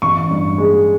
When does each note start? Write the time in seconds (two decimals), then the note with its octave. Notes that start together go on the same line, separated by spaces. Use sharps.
0.02 A1 C#6
0.30 G2
0.58 G#3